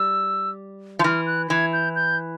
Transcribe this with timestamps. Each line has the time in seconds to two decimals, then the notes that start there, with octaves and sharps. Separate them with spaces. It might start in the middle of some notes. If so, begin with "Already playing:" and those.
Already playing: G3 E6
0.99 F3
1.04 E3 F6
1.26 F#6
1.50 E3 G#6
1.73 G6
1.95 G6